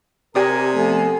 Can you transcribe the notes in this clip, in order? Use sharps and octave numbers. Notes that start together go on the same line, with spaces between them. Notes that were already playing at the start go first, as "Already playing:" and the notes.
C3 G4 A#4 D5 G#5 A#5 D#6
F3 A3 B3 G#5